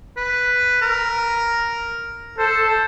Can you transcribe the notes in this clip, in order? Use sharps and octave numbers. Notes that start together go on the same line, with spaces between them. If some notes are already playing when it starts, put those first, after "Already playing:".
B4
A#4
A4 C5